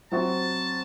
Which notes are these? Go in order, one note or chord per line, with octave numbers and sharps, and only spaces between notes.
F#3 C4 F#4 A5